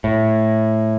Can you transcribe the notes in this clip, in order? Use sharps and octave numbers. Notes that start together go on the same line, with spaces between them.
A2